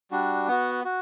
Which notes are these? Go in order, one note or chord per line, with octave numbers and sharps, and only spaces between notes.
G3 D4 F#4
B3 F#4 F#5
F#4